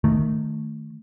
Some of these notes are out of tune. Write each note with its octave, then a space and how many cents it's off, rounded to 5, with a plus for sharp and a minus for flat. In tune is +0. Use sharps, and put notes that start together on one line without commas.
D#3 -15 A3 +0